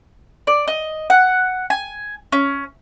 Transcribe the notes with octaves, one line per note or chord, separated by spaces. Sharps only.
D5
D#5
F#5
G#5
C#4